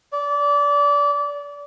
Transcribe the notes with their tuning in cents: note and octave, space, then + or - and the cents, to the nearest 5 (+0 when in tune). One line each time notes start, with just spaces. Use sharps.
D5 -25